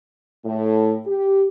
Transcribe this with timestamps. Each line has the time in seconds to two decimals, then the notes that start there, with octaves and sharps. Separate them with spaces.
0.45 A2
1.06 G4